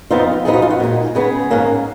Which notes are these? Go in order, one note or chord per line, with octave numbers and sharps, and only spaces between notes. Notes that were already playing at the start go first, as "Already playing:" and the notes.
F2 F3 B3 D#4 F4
F#2 F3 B3 D#4 G#4
F#4
F4
F#4
A#2 G#3 D#4
C#3 G#3 B3 G#4
G#2 D#3 A#3 C#4